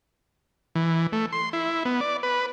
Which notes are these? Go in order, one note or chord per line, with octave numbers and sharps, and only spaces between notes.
E3
A3
C6
E4
B3
D5
B4